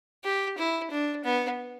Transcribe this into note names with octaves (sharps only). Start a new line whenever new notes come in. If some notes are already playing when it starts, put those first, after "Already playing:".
G4
E4
D4
B3